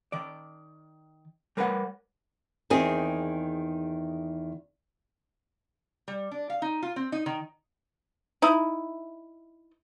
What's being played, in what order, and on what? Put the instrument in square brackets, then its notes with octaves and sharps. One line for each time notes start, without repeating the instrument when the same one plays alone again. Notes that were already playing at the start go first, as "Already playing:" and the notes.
[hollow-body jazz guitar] D#3 D5
G3 A#4 B4 C#5 D#5 F#5
[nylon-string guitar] E2 D#3 C4 G#4
[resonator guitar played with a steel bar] G3
D4
F5
D#4
F4
C4
D#4
D#3
[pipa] D#4 E4